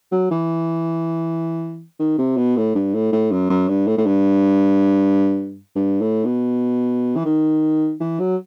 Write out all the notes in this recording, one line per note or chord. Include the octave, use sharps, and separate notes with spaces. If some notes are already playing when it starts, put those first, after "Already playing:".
F#3
E3
D#3
C3
B2
A2
G2
A2
A2
F#2
F#2
G2
A2
A2
G2
G2
A2
B2
E3
D#3
E3
F#3